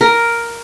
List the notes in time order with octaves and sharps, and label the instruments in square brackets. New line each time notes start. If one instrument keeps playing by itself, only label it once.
[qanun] A#4